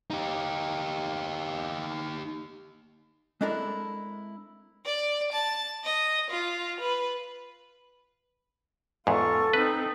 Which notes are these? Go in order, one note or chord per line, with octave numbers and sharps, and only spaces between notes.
D#4 G4
G#3 C4 D4 E4 A4 A#4
D5
A5
D#5
F4
B4
E2 G#2 F4 A4 C#6
C4 D#4 B4